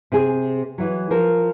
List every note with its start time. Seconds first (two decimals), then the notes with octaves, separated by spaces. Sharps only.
0.12 C3 G#4
0.78 E3 F#3
1.11 F3 A#4